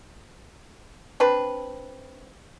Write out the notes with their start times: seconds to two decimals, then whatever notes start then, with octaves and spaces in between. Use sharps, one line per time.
1.20 C4 D4 B4